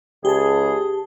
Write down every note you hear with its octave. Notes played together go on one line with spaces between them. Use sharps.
C#2 G4 G#4 A5